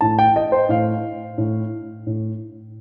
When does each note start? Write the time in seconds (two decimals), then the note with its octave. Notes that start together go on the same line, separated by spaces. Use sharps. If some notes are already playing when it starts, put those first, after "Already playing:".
0.01 A2 A5
0.19 G5
0.36 D#5
0.52 C5
0.69 A2 F5
1.38 A2
2.07 A2